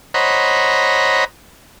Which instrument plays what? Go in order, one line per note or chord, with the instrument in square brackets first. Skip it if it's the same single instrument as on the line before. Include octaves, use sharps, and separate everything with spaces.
[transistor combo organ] C5 C#5 D#5 F#5 A#5 B5